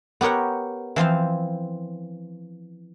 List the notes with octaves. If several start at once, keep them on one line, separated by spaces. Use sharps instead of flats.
B3 G4 A#4 C#5 F#5
E3 F3 C4 F5